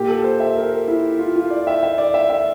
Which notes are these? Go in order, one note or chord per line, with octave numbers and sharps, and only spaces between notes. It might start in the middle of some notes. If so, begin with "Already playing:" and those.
Already playing: A#2 G4
A4
C5
E5
A#4
A#4
E4
F4
F4
D5
E5
E5
D5
E5
E5